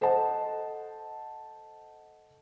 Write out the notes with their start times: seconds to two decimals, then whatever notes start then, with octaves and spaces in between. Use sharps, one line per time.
0.01 A4 C5 D#5 F#5 A5